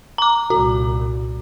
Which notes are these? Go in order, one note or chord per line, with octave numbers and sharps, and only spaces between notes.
A#5 D6
C2 A#2 F#4